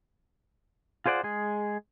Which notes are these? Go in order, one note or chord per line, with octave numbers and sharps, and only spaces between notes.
F4 G#4 C5 D5 F#5
G#3 G#4